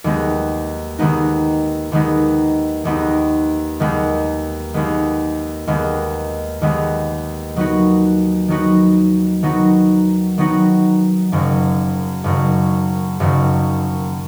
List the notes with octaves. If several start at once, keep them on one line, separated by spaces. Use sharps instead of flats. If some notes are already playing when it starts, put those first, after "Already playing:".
D#2 D#3 G#3 B3 D#4
D#2 D#3 G#3 B3 D#4
D#2 D#3 G#3 B3 D#4
D#2 D#3 G#3 B3 D#4
D#2 D#3 G#3 B3
D#2 D#3 G#3 B3
D#2 D#3 G#3 B3
D#2 D#3 G#3 B3
D#3 F#3 B3 D#4 F#4
D#3 F#3 B3 D#4 F#4
D#3 F#3 B3 D#4 F#4
D#3 F#3 B3 D#4 F#4
F#1 F#2 D#3
F#1 F#2 D#3
F#1 F#2 D#3